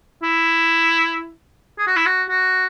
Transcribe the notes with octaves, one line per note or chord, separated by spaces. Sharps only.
E4
G#4
F#4
E4
F#4
F#4